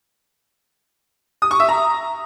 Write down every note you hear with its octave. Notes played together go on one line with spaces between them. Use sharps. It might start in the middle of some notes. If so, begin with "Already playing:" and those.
D#6
C#6
E5
A#5